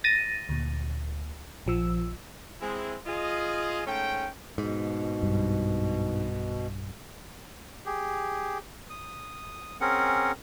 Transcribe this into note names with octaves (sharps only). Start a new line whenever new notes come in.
A6 A#6 D#7
D2 A#2
A#1 F3 E6
G#3 C4 E4
F4 G#4 D#5
G#2 A3 C#4 G5
G#2 B2
B1 G2
G4 G#4
D#6
C4 C#4 G#4 A#4 F#5